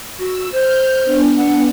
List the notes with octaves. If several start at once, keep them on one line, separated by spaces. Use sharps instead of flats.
F#4 E6
C5 F6 G6
B3 D4
F#5